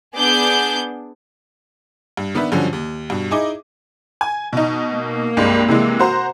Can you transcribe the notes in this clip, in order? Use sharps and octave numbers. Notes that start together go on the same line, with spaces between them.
B3 D4 G#4 D6 G6
G2
D#3 B3 D4 B4 E5
G2 D3 F3 F#3 C#4
D#2
G2 B2
D#4 E4 G#4 D#5 D6
G#5
B2 D#4
A#3
C2 G2 G#3
C3 E3 G#3
F#4 C5 A#5